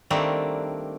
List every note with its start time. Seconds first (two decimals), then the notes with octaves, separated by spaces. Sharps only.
0.10 D#3 G3 A3 A#3 C4 D4